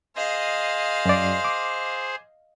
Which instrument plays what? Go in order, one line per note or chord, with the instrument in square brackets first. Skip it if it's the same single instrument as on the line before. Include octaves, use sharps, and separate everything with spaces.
[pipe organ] G#4 C5 [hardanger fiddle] D#5 F5
[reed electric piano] F#2 D5
D6